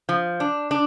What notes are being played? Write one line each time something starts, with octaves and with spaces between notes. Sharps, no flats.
F3
D4
D4